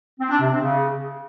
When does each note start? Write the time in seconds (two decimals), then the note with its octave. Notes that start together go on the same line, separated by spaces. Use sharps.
0.20 C4
0.30 D4
0.40 C3
0.50 C4
0.61 C#3